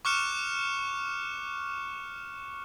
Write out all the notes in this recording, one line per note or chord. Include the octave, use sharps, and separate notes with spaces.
C#6 D6 F6 F#6 C#7 E7